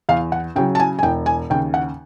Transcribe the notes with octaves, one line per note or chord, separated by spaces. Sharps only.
E2 F5
F#5
C#3 F#3 G5
A5
G#5
G#5
E1 G5
G#5
D#2 C#3 G5
F#5